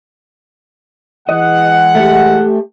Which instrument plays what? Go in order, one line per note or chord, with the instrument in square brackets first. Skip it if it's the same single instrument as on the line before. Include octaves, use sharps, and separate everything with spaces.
[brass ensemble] E3 G#3 F#5 [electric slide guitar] D#5
[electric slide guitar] A3 G4